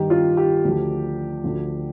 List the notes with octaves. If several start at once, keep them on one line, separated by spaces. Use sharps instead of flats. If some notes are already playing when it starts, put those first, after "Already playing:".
Already playing: G2 D#3 G4
F4
G4
D2 D3 F3
D2 D3 F3